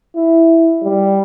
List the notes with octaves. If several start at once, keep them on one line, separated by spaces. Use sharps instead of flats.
E4
G3